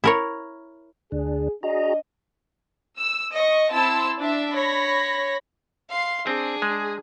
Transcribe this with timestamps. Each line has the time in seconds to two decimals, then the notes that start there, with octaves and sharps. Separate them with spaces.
0.04 E4 A#4 C#5
1.12 D2 D4 G#4
1.63 D4 F#4 G#4 D#5 A#5
2.97 E6
3.34 D#5 C#6
3.71 C4 E4 A5 C6 E6
4.19 D4 E5
4.55 C#5 B5 A#6
5.90 F5 C6
6.27 C4 D4 G#4
6.62 G#3